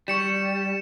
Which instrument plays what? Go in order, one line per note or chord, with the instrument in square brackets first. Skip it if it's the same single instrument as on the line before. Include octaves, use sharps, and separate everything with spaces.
[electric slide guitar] G3 [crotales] C#6 C#7 E7